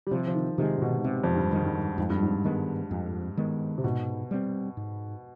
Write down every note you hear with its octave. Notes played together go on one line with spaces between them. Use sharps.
G3
C3 F3
F3
D#3
C3 D#3 G#3
G#2
B2
C3
F2
G2
D#3 G#3
G#2
G2
F2 G#2
G2
G#2
D#3 G#3 B3
F2
D#3 G#3 B3
C3
G#2 B2
G3 C4
G#2